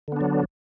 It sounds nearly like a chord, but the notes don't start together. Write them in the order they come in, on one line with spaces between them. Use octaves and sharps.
D3 B3 D4 F#3